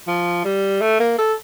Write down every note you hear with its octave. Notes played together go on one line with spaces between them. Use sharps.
F3
G3
A3
A#3
A4